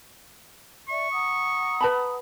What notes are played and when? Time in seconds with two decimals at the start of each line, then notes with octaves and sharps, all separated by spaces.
0.89 D5 E5 C#6
1.12 F#5 A#5 D#6
1.81 B4 A5 B5